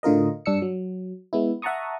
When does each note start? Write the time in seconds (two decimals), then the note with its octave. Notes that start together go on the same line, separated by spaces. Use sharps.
0.03 A2 D3 F4 A#4 D#5
0.46 G2 D4 E6 C#7
0.62 F#3
1.33 G#3 B3 E4
1.62 E5 F#5 A5 A#5 C#6 D#6